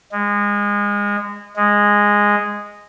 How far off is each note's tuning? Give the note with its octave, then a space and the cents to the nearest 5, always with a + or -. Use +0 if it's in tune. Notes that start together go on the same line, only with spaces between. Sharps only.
G#3 -25
G#3 -10